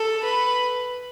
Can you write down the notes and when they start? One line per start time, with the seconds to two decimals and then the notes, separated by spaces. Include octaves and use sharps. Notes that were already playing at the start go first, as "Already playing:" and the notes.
Already playing: A4
0.23 B4